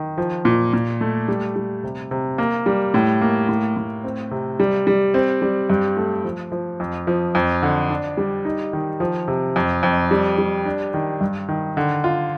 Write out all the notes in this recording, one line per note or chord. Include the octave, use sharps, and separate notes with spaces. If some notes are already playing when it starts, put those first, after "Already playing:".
Already playing: D#3
F3
A#2
A#2
A3
G3
G3
C3
C3
A#3
G3
A2
A#3
A2
A2
C4
C3
G3
G3
C4
G3
G2
A3
F3
F3
F2
F3
F2
D3
D4
G3
D#4
D#3
F3
C3
F2
F2
G3
G3
D4
D#3
G2
D#3
D3
F4